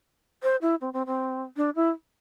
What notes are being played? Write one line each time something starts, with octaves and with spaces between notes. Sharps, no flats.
C5
E4
C4
C4
C4
D4
E4